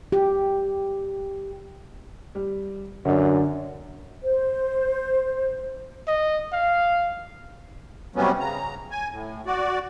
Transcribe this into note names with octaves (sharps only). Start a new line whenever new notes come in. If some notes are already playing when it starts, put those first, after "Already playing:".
G4
G3
F#2 D3 D4
C5
D#5
F5
C3 F#3 G3 B3 C#4
C#3 A#5
G#5
A2
F#4 D5